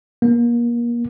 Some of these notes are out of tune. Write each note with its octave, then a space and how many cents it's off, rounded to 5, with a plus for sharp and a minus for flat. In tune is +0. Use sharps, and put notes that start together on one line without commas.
A#3 +30